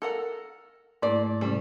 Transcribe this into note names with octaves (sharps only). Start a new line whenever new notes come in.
A4 A#4 F#5
G#2 A3 A#3 E4 D5
C3 G3 G#3 C#4 A4